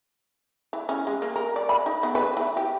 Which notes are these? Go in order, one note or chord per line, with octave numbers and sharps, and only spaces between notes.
E3
C#4
G#3
A#3
A#4
D5
B5
D#4
B3
B4
E3
G4